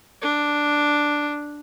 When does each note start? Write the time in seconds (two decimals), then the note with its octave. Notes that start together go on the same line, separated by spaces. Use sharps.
0.22 D4